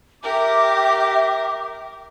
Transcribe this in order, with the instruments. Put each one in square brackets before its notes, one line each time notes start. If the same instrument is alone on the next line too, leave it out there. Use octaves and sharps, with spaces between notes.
[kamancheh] G4 [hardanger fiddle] A#4 [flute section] E5 D6